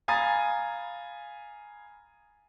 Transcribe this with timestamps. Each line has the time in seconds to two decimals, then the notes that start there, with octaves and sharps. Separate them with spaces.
0.08 F5 G#5 A#5 B5 D#6 A6